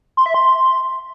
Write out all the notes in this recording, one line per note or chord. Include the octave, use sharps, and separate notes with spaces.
C6
E5
C6